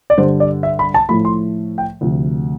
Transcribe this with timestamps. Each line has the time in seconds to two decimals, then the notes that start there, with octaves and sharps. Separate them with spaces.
0.10 D5
0.17 G2 D3 G3 D4 C5
0.40 D5
0.63 E5
0.79 B5
0.94 A5
1.09 A2 F3 A3 B5
1.25 C6
1.78 G5
2.01 D2 C3 F3